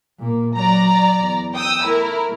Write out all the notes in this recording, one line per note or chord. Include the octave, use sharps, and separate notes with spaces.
A#2 A#3
F#3 D5 A#5
E2
G5 D#6 E6
A3 E4 A#4